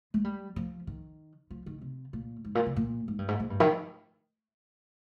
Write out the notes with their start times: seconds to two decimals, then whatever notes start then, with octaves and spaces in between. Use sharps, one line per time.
0.14 G#3
0.24 G3
0.56 F3
0.87 D#3
1.51 F3
1.66 D#3
1.81 C3
2.13 A#2
2.45 G#2
2.55 A#2
2.66 C3
2.76 A#2
3.08 G#2
3.19 G2
3.28 G#2
3.40 A#2
3.50 G2
3.60 D#3